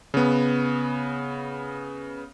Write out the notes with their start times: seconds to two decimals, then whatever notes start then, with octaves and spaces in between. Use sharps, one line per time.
0.14 C#3 B3